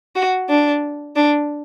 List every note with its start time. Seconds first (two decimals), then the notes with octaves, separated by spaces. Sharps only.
0.15 F#4
0.49 D4
1.16 D4